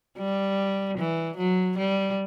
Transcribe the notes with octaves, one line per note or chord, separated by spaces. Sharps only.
G3
E3
F#3
G3